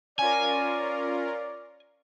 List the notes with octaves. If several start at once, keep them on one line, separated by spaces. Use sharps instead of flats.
C#4 F4 A#4 D5 G#5